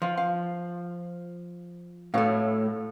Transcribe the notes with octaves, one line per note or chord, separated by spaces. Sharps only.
F3 F4 F5
F5
A2 A3 F#4 C#5 F5